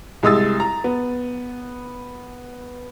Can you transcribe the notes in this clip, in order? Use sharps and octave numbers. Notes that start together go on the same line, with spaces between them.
C2 G#3 D#6 E6 A6
A#5
B3